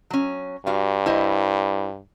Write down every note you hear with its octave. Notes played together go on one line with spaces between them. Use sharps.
F#3 C#4
G2 F#4 F5
E4 C5 D#5